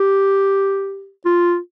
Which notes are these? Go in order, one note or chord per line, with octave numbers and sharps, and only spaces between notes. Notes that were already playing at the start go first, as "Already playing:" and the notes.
Already playing: G4
F4